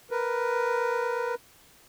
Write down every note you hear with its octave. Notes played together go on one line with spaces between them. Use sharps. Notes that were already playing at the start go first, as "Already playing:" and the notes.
A#4 B4